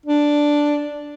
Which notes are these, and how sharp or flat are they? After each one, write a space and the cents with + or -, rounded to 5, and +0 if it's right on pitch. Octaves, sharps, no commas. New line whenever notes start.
D4 +0